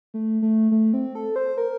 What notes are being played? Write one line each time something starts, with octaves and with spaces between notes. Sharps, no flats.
A3
A3
A3
C4
A4
C5
A#4